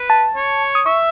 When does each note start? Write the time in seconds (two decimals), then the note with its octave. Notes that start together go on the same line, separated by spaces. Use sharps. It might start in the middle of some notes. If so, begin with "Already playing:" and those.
Already playing: B4
0.10 A5
0.36 C#5
0.75 D#6
0.86 E5 C#6